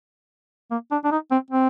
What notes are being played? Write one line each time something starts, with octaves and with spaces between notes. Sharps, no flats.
A#3
D4
D4
D#4
C4
C4